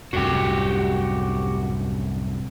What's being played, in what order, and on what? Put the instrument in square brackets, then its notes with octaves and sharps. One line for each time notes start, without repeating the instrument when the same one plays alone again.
[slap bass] C2 F#2 A2 [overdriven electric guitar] F#4 G4